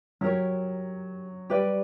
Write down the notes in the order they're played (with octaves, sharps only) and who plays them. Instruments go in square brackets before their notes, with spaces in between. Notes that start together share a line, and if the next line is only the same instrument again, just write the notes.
[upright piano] F#3 [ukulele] G4 A#4 C#5
[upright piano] G3 [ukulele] G4 B4 D5